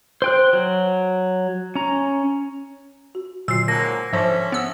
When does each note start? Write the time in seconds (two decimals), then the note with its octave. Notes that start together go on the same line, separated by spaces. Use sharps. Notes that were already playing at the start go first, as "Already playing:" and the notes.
0.22 C5 G5 F#6
0.53 F#3
1.75 C#4 A#5
3.15 F#4
3.48 A#2 D3 F#3 E6 C7
3.68 G#2 F#3 A#3 A5 A#6
4.13 G#2 D3 F3 C#4 E5
4.52 B3 E6